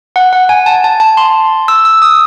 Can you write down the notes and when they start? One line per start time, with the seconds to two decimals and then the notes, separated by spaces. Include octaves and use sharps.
0.16 F#5
0.33 F#5
0.49 G#5
0.66 A5
0.84 A5
1.00 A5
1.17 C6
1.68 E6
1.85 E6
2.02 D#6